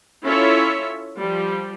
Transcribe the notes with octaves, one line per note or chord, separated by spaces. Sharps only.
C#4 E4 F4 A4 C#5 E5
F3 G3